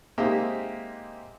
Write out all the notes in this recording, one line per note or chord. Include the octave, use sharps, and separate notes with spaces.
G#3 A#3 C4 D#4 G4 E5